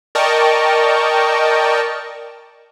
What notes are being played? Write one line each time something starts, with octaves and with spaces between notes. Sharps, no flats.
A#4 D5 D#5 G5 A5 C#6